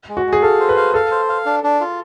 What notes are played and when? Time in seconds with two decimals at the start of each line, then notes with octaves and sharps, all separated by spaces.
0.09 G#3
0.17 F#4
0.26 G#3
0.33 G#4
0.42 A4 F5
0.60 C5
0.69 B4
0.77 F5
0.94 A4 F5
1.11 C5
1.29 F5
1.46 D4
1.64 D4
1.81 F4